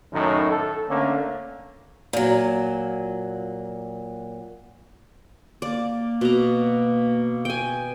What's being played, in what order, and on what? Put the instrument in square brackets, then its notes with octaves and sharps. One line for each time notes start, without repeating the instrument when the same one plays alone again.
[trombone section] F#2 A2 D#3
A4
D3 A3 A#3 C#4
[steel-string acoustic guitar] A#2 F#3
[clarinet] A#3 [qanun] D5
[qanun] B2 A#5
G5 G#5